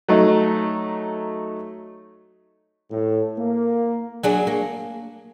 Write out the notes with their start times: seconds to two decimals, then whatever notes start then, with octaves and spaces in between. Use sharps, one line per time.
0.08 F#3 A3 D#4
2.91 A2
3.38 A#3
4.23 F#3 D4 G#4
4.47 A#3